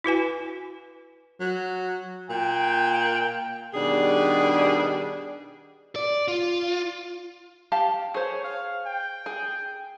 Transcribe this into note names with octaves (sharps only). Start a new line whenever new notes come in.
E4 F#4 B4 G#5
F#3
A#2 G5
B2 D#3 G3 D4 G#4
D5
F4
G4 F5 A5
G#4 C5 C#5
F5
G5
G#4